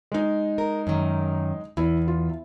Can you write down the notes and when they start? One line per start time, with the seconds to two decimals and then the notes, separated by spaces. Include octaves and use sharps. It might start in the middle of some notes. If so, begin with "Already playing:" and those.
0.12 G#3 D#4
0.58 A#4
0.87 F#2 D#3
1.77 E2 E4
2.08 F4